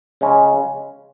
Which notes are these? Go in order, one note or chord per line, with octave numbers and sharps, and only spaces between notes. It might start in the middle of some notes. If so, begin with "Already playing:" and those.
C#3 G#3 C#4